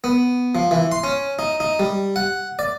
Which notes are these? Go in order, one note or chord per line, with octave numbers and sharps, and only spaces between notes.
B3
F3
E3
C6
C#4
D#4
D#4
G3
F#5
D5